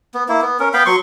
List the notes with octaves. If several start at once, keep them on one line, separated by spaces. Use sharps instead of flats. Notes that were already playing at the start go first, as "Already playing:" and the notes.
B3
A#3 E4
B3
C#4 A#4
B3 F5 G5 B5
F#3 C6 C#6